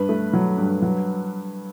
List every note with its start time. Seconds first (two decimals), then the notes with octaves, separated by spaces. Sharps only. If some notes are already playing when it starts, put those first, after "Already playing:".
Already playing: G2 B4
0.09 A3
0.33 F#3
0.58 G2
0.82 F#3